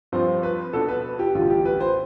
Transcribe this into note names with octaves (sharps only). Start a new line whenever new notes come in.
G2 F3 C4 F4 C5
B4
B2 B3 D4 A4
B4
G4
A1 G2 D3 F4
G4
B4
C5